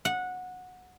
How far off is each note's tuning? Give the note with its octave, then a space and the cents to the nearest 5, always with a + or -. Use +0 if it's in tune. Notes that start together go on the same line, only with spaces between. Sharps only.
F#5 -15